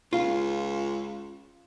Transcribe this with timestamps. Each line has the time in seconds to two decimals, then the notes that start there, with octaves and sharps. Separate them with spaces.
0.13 C#2 F4